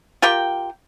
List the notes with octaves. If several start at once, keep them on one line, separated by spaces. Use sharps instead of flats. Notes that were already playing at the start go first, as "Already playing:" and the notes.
F4 G4 A#4 G5